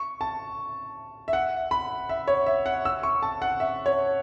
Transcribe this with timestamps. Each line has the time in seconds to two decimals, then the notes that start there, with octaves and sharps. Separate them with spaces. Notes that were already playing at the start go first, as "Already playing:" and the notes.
Already playing: C#6
0.21 A5
1.28 E5
1.33 F#5
1.71 B5
2.09 E5
2.28 C#5
2.46 E5
2.66 F#5
2.85 E6
3.03 C#6
3.22 A5
3.42 F#5
3.60 E5
3.86 C#5